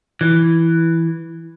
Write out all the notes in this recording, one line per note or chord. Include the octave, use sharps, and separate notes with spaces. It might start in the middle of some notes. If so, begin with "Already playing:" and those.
E3